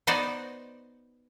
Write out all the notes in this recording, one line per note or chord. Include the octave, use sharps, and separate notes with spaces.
B3 D#4 F#4 C5 D5